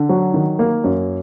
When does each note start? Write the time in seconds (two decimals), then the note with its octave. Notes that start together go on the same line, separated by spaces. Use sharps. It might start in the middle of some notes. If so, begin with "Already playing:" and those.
Already playing: D3
0.09 F#3
0.34 D#3
0.59 A#3
0.84 F#2